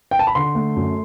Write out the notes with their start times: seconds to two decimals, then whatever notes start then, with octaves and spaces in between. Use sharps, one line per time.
0.11 G5
0.19 A5
0.27 B5
0.35 D3 C6
0.55 A3
0.76 F#2